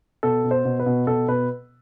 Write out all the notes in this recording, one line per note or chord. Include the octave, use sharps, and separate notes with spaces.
B2 A4
B2
C5
B2
B4
B2
B2 A4
B2 B4